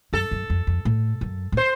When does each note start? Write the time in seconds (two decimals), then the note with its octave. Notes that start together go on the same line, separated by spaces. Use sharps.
0.13 F#2 A4
0.31 F#2
0.50 F2
0.67 F2
0.85 A2
1.21 F#2
1.52 A2
1.57 C5